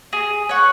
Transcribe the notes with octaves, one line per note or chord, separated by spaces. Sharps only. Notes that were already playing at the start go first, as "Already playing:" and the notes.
G#4
C#5 F#5